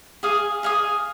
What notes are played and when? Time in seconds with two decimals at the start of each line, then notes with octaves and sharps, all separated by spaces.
0.23 G#4 F5 G#5 D#6
0.63 G#4 F5 G#5 D#6